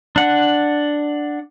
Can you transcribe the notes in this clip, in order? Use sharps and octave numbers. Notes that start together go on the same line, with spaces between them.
D4 F#5